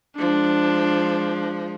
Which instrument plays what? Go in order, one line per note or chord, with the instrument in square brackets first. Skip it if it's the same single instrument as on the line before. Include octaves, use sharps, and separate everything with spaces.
[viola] F3 G#3 [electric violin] D4